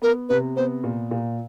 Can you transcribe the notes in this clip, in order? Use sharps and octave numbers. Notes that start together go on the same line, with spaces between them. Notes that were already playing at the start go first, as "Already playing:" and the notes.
B3 A#4
C3 B4
B3 C5
A#2
A#2